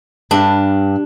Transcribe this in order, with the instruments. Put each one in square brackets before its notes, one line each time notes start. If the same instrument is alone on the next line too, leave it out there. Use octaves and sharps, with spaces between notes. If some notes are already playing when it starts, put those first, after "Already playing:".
[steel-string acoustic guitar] G2 [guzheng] D4